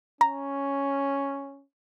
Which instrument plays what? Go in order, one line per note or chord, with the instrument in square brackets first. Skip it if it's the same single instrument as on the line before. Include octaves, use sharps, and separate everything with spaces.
[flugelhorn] C#4 [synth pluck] A#5